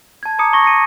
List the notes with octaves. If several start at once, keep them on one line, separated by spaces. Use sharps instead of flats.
A5 G#6
A5 A#5 D6 D#6 C#7
A5 C#6 A#6
A#6 C#7 D#7